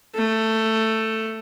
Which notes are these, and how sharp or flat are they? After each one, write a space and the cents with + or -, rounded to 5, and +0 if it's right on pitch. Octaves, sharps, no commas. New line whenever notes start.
A3 +10